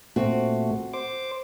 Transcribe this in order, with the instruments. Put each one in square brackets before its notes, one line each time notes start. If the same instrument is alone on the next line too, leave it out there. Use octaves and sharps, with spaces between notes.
[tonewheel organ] A#2 A3 [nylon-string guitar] C4 F#4
[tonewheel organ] C5 D6